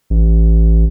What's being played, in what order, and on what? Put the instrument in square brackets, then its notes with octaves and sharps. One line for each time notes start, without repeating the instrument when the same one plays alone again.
[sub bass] A1